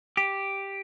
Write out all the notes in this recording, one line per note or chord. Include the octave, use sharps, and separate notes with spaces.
G4